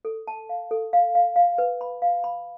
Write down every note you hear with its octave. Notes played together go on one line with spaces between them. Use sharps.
A4
A5
F5
A4
F5
F5
F5
B4
B5
F5
B5